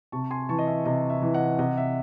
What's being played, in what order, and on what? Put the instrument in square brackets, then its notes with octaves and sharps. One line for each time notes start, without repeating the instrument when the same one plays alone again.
[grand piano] C3 A5 C#6
G#5 C6
E3 A5 C#6
D#5
E5
C3 D#5
E5
E3
D#5 F#5
C3 D#5 F#5
E5